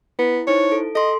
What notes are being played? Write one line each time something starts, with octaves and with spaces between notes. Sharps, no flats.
B3 E4
D#4 E4 C5 C#5
A4
A4 D#5 C6